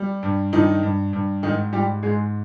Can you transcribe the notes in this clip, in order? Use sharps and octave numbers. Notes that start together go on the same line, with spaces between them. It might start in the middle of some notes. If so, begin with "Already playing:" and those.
Already playing: G3
G2
G2 D#3 D#4
G2
G2
G#2 D#3 D#4
G#2 G3 G4
G#2 G#3 G#4